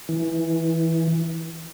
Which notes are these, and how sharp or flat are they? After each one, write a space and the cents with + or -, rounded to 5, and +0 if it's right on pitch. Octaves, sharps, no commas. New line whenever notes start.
E3 -10